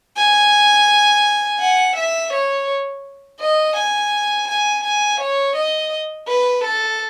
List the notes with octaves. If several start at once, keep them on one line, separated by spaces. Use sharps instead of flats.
G#5
F#5
E5
C#5
D#5
G#5
G#5
G#5
C#5
D#5
B4
A4